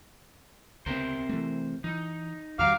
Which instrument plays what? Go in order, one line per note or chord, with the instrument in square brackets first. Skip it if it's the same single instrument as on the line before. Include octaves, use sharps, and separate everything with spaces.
[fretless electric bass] C#2 B3 [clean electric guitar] C3 A#4 C5
[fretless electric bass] E3 A3
[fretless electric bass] E3 [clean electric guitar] D#4
[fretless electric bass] E2 D#3 G3 [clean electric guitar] F#4 A#5 [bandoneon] F5 D6 F6